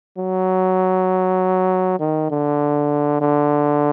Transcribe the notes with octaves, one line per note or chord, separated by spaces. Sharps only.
F#3
D#3
D3
D3